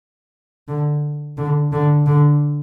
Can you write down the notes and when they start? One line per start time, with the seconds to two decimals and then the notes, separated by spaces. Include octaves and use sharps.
0.68 D3
1.37 D3
1.72 D3
2.07 D3